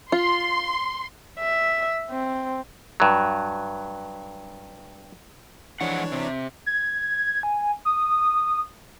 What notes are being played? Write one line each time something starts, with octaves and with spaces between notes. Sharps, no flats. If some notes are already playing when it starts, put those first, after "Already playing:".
F4 C6
E5
C4
G2 F#3
E3 F3 G#3 D4 C#5 F#5
C3
G#6
G#5
D#6